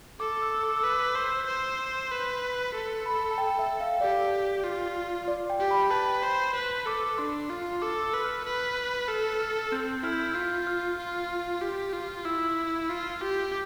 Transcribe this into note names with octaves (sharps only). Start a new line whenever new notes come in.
A4 D6
E6
D6
E6
B4 D6
C5 E6
C5
B4
A4 C6
B5
A5
G5
E5
F5
G4 D5
F4
D5
G5
G4
B5
B4 A5
C5 B5
B4
A4 D6
D4 C6
F4 C6
A4 D6
E6
B4
F6
B4
A4 F6
F6
C4 G6
E4 F6
G6
F6
F4 G6
F6
F4
G4
F4
E4 E6
F4
G4